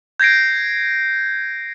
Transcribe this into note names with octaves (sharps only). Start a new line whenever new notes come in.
G6 G#6 A#6 C7 D7